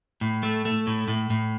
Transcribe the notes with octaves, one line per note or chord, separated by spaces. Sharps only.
A2
A3
A3
A2
A2
A2